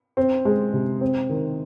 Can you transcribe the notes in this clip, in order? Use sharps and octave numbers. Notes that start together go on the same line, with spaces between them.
C4
G#3
C3
C4
D#3